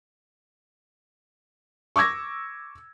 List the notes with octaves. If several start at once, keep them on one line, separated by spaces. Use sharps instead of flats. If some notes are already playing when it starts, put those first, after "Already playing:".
C#6 D6 E6 G#6 A#6